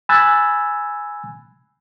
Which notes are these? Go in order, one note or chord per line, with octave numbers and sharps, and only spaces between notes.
G#5 B5 E6 F#6 G#6 A6